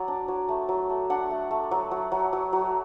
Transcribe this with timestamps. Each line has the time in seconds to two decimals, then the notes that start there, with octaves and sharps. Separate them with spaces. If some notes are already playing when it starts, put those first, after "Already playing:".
Already playing: F#3 D5
0.08 D4
0.28 F#3
0.49 A3
0.69 F#3
0.90 A3
1.10 D4 F#5
1.30 A3
1.51 A3
1.71 F#3
1.91 F#3
2.12 F#3
2.33 F#3
2.53 F#3